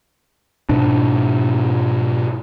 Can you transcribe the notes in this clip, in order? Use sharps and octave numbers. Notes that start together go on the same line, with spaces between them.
G#2 B2 D4